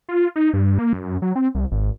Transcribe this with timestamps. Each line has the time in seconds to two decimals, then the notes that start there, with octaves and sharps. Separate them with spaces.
0.09 F4
0.36 D#4
0.54 G2
0.79 A#3
0.93 F#2
1.22 F#3
1.36 C4
1.55 C2
1.72 G#1